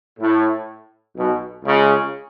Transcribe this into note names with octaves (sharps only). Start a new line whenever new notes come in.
A2
B1 B2
C#2 C#3